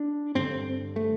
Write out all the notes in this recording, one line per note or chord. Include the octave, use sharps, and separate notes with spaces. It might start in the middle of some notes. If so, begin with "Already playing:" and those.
Already playing: D4
G2 D3 C4
A3